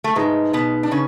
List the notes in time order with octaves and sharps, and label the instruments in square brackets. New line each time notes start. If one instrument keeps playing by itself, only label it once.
[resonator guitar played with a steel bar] A3
[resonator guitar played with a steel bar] G#2 G#3 [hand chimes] D#4 G#4 B4
[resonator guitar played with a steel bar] B2 B3
D4
C#3 C#4